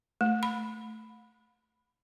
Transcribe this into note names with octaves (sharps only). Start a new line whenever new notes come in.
A3
B5